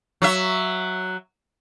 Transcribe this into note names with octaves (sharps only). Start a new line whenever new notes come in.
F#3 E5